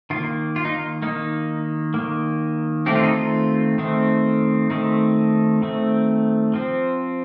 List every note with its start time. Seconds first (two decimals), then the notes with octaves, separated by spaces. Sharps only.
0.10 D#3 A#3 F4
0.56 F4
0.65 D#4
0.74 F4
1.02 D#3 A#3 D#4
1.94 D#3 A#3
2.86 D#3 A3 C4 G4
2.95 F4
3.04 D#4
3.13 F4
3.78 D#3 A3 C4
4.70 D#3 A3 C4 D#4
5.62 D#3 A3 C4
6.54 F3 C4